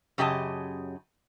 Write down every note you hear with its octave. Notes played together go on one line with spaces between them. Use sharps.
F#2 C#3 G4 D#5 G#5 A5